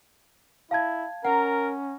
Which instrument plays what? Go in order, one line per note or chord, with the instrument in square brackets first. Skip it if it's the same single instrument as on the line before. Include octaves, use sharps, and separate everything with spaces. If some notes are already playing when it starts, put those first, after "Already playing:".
[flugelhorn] E4 [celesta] F5 A5 G#6
[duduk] C#4 [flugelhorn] A#4 [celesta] F#5 [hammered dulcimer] A#5